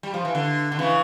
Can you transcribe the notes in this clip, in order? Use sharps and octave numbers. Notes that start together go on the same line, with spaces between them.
G3
F3
E3
D3
D3
C#3 E3